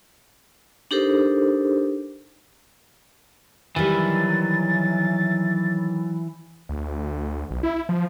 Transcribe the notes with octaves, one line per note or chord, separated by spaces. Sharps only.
D4 D#4 G4 A4 A#4 C5
D#3 E3 F#3 G3 B5 A6
D2
B1
E4
F3